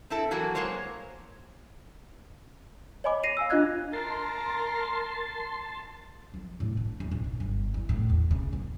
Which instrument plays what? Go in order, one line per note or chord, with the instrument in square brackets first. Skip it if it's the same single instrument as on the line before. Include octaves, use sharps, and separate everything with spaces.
[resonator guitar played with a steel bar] C4 E4 A4
E3 F#3 A#3 F#4
F#3 G#3 A#3 C5 C#5
[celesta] C#5 D#5 G#5 B5 D6
A#6 C7 D#7 F7
F5 G#5 E6
D4 F4 D#5 F#6 G#6
[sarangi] A#4 [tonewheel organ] A5 C6
[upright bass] F3
A2
D4
E2
A#1
D#4
G1
E2
A2
E2
C#3
A#3